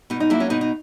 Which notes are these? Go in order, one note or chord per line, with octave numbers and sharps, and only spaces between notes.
B2 D#4
D#4
F#3 A#3 E4
C#4
B2 D#4
D#4